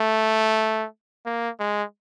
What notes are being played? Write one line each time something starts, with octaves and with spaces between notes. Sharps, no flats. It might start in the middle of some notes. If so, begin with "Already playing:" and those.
Already playing: A3
A#3
G#3